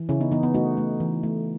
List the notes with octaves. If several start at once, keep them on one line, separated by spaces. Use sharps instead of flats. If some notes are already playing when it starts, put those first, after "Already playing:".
Already playing: E3
C#3 C#4 E4
B3 D#4
E3 B3 D#4
B3
A3 D#4 F#4
A3
E3
A3